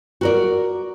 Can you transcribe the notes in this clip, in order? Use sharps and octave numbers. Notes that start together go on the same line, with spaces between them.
F#4 A#4 D5